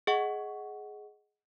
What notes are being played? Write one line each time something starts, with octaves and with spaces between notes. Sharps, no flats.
G#4 D#5 F#5 C#6